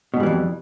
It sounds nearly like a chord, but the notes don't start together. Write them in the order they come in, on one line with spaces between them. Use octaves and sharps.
B2 G#2 G3 E3 F2